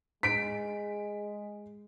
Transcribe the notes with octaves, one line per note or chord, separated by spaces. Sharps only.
G#3 B6 D7